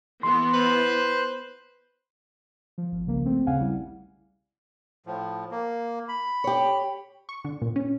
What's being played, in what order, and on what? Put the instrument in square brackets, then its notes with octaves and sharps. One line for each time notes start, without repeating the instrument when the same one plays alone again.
[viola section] E3 B3 [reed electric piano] C6
[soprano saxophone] B4 [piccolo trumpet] C5
[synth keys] F3
G#1
C2 C#3 F3 A#3
A3 C4
A#1 D#2 C#3 F5 F#5 G#5
G3 E4
[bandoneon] A2 F3
A#3
B5
[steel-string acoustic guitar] G4 C#5
[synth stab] C#6
D3
A#2
C#4